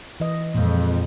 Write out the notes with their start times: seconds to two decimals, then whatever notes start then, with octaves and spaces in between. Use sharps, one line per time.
0.20 E3 D#5
0.55 F2 A#2 G#3